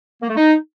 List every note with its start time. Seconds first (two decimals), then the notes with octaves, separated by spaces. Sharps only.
0.22 A#3
0.29 A3
0.36 D#4